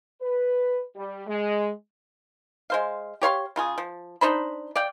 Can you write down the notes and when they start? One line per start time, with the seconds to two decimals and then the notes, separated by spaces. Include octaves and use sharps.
0.22 B4
0.96 G3
1.27 G#3
2.70 G#3 C5 F5
3.22 G4 C#5 F5 C6
3.56 C#3 F4 G#4
3.78 F3
4.21 D4 D#4 C5 B5
4.76 D5 F5 G5